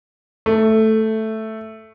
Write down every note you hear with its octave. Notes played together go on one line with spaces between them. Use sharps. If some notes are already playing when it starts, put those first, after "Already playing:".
A3